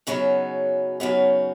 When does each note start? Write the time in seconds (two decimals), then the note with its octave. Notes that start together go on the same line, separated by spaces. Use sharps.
0.07 F#2 C#3 F#3 B3 D#4
1.00 F#2 C#3 F#3 B3 D#4